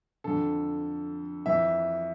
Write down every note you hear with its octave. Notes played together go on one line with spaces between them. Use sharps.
F2 D3 A4
F2 E3 E5